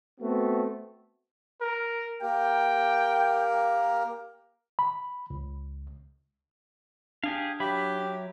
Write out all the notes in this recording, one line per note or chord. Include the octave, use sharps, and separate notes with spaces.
A3 B3 C4 F#4
A#4
A#3 G4 A#4 G5
B5
C#2
D4 G4 G#4 F5
F#3 G4 E5 B5